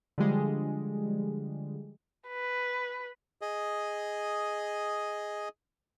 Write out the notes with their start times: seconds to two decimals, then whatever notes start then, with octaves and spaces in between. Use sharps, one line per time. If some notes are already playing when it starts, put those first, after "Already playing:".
0.18 D3 F3 G3 G#3
2.28 B4
3.41 G#4 D#5